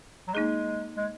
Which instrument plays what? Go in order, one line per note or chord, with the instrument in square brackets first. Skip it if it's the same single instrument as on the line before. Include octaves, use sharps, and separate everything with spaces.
[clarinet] F#3
[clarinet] G#3 [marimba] A#3 D#4 G#4
[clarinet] G#3